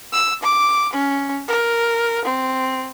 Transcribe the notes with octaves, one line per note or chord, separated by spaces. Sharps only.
E6
D6
C#4
A#4
C4